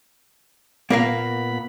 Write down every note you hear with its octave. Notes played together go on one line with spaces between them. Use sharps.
A#2 A#3 B3 A#4 F5 B5